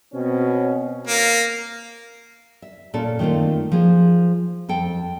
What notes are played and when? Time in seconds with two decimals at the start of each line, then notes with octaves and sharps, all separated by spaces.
0.14 B2 C4 C#4
1.07 A#3
2.62 E5
2.94 A#2 C#4 A4
3.19 D#3 A3 A#3 C4 F4
3.72 F3 G#4 C5
4.69 F2 A4 G5